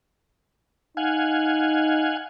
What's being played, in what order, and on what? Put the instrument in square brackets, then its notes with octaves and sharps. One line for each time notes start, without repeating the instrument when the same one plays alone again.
[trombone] D#4 [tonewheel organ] F5 F#5 G#5